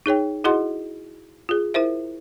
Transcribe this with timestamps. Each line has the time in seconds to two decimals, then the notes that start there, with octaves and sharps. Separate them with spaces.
0.06 D#4 G#4 C#5 G5
0.44 E4 F#4 G#4 D#5 F#5 C6
1.49 F4 G#4
1.74 E4 A#4 C5 E5